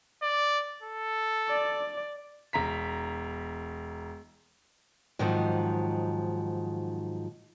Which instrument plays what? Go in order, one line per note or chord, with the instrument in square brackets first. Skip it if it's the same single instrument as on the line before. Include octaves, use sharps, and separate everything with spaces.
[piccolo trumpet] D5
A4
[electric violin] D5
[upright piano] E1 A#5 B6
[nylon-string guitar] G#2 D#3 F3 F#3 C4